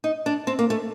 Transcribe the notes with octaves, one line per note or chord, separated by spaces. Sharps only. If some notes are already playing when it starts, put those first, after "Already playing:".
D#4
D4
C4
A#3
A3